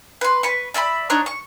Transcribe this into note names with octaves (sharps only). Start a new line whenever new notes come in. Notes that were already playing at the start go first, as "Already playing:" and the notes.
B4 C6
B4 C#6
D5 E5 A#5 B5
D4 D#4 C#5 F#6
C#6